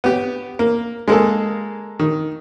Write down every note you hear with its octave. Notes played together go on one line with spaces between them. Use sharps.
B3 G4
A#3
G#3 A#3 G#4 A4
D#3